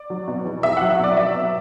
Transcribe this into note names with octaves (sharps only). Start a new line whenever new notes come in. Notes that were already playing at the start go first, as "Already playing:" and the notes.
Already playing: D5
F#3
B2
E2
E2 E5
F#3 F#5
E5
B2 D5
F#3 E5
B2